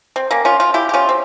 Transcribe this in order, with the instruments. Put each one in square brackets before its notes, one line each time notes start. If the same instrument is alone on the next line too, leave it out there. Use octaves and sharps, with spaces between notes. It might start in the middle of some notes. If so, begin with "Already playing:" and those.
[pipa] C4
A#3 C#4
C#4 F4
C#4 F4
E4 G4
G4
C#4 F4
C4